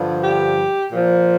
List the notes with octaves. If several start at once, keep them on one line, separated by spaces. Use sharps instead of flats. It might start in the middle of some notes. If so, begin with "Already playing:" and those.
Already playing: G2 D3 F3
G4
A#2 F3